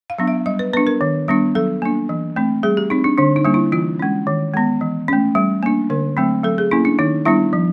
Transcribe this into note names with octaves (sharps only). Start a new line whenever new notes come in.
F5
F#3 B3 D4
E5
G3 D#5
B4
B3 D4 B4
A#4
D#3
G3 B3 D4
F#3 A4
A#3 D4
E3
A3 C4
G3 G#4
G4
C4 D#4
D4
D3 D4
D#4
G3 A#3 D4
E4
E3 F4
G#3 C#4
D#3
G#3 B3
E3
A3 C#4
G3
A#3 D4
D3 A#4
F#3 A3 C4
F#3 A4
G#4
A#3 C#4 E4
D4
D#3 D#4
G3 B3 D4 E4
F3